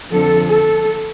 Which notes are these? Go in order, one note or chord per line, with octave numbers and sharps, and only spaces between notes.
F2 D3 F3 A4
A4